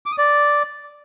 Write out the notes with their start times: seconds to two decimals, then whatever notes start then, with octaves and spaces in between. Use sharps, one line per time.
0.06 D6
0.12 D#6
0.18 D5